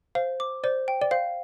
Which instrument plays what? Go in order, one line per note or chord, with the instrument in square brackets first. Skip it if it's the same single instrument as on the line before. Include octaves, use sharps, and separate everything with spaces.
[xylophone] C5 [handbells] F5
[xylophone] D6
[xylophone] C5 [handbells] D5
[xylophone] G5
[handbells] D5
[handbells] C5 [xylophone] F5